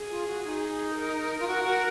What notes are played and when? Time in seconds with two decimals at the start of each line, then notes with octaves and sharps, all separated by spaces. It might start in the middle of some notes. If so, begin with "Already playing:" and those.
Already playing: G#4
0.10 F4
0.27 F#4
0.44 D#4
0.96 A#4
1.39 F4
1.48 F#4
1.64 F#4